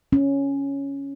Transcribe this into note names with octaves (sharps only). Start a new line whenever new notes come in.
C#4